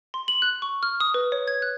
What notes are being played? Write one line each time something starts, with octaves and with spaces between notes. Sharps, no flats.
C6
F#7
F#6
C#6
F6
D#6
B4
C#5
G#6
F#6